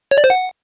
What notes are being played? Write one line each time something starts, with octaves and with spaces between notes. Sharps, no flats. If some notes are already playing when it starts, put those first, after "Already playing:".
C#5
D5
C5
F#5